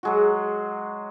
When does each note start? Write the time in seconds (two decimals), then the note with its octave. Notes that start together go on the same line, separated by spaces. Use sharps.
0.03 F#3 G#3 F#4